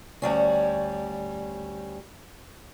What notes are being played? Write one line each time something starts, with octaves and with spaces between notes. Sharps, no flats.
D2 G3 C#4